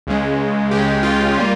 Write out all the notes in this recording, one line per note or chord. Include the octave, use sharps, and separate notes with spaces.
C#2 C#3 G#3
C#2 C#3 G#3 G4
F4
G3 A#3